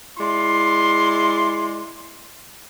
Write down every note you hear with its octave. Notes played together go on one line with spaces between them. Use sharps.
G#3 E4 D5 C6